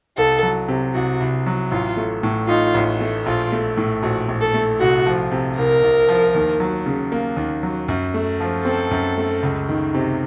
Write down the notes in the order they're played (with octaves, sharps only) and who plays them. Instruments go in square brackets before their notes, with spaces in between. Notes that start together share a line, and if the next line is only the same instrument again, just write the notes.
[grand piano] C2 [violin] A4
[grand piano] F#3
C3
[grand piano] C2 [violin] F#4
[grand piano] C2
F#3
[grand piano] A1 [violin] F4
[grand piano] A3
A2
[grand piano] D#4 [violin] F4
[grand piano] A1
A3
[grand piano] A#1 [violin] F4
[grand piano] A3
A2
[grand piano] A#1 [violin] F#4
[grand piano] A#1
[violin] A4
[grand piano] A3
[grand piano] C2 [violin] F#4
[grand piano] F3
C3
[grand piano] C2 [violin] A#4
[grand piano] C2
F3
D#2
F#3
C#3
A#3
D#2
F#3
F#2
A3
F3
[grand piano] C4 [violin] A4
[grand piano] F#2
A3
C#2
D#3
C3